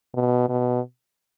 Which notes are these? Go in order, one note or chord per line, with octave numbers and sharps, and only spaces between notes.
B2
B2